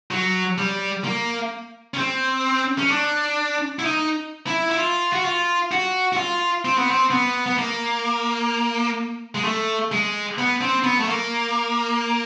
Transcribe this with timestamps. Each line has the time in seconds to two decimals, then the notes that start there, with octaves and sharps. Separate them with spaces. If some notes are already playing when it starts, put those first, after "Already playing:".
0.11 F#3
0.58 G3
1.04 A#3
1.94 C#4
1.98 C4
2.78 C#4
2.91 D4
3.79 E4
3.85 D#4
4.47 E4
4.70 E4
4.77 F4
5.13 F#4
5.25 F4
5.72 F#4
6.13 F#4
6.17 F4
6.65 C4
6.78 B3
6.91 C4
7.11 B3
7.46 B3
7.58 A#3
9.35 G#3
9.44 A3
9.92 G#3
10.38 B3
10.61 C4
10.84 B3
11.00 A3
11.08 A#3